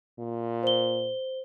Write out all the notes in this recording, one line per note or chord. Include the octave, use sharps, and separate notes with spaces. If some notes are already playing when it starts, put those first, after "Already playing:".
A#2
C5 G7